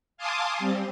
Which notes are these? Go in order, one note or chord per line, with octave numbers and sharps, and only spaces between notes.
F5 G#5 A5 C6 D6 D#6
G3 C4